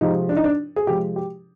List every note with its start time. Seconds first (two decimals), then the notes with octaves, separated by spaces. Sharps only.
0.01 C3 F3 G#3 D#4
0.29 D4
0.37 D#4
0.44 D4
0.76 G#4
0.87 C3 F3 G#3 G4
1.16 G4